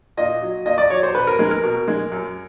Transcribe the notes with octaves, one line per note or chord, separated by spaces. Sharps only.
A#2 D#5
F#3
A#2 D#5
D5
F#3 C#5
C5
B2 B4
A#4
G#3
A#4
B2
G#3
F#2